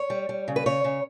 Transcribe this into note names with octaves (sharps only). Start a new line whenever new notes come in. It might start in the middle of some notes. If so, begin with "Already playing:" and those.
Already playing: C#5
G3
G3
C#3
B4
C#3 C#5
C#3